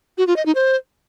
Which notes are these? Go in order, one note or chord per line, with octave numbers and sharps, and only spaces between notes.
F#4
F4
D#5
D#4
C5